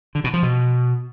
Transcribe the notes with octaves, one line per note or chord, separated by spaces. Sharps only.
D3
B2
F3
B2